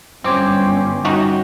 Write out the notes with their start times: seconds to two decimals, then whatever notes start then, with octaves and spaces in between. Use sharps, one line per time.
0.24 G1 F#2 G3 C4 C#4 D6 G#6
1.05 D#4 F#4 G4